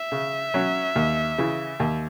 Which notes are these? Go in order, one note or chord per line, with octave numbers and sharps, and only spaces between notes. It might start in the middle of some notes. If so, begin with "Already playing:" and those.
Already playing: E5
C#3
F#3 C#4
D#2
C#3 E3
D#2